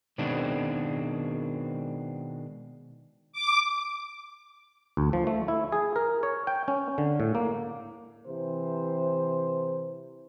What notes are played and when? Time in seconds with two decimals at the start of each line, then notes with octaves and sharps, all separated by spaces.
0.18 B2 D#3 G#3 C4 D4 F#4
3.33 D6
4.97 D2
5.13 F3
5.27 A3
5.48 E4
5.72 G#4
5.96 A#4
6.23 C#5
6.47 G5
6.68 C#4
6.98 D3
7.20 A2
7.35 A#3
8.27 C3 E3 C5